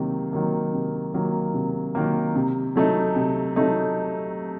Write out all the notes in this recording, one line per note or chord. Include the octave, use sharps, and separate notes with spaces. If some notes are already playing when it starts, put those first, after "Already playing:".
Already playing: C3 D#3 F#3 A#3
D#3 F#3 A#3
C3
D#3 F#3 A#3
C3
D#3 F#3 A#3
C3
F#3 A3 D#4
C3
F#3 A3 D#4